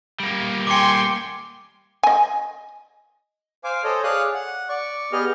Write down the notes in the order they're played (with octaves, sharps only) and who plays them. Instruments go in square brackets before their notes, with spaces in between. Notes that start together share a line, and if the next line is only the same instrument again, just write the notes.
[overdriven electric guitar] G3 A#3
[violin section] G5 G#5 C6 [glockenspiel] D6 C#7
[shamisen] D#5 G#5
[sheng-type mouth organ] C5 F5 G#5 D6
A4 C5 C#5 D#5
G#4 C#5 D5 F5 D#6 F#6
F#5
D5 C#6
B3 G4 G#4 D#5 F6